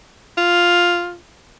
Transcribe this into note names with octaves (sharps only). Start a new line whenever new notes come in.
F4